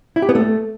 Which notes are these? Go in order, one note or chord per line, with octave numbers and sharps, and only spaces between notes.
E4
G4
B3
A3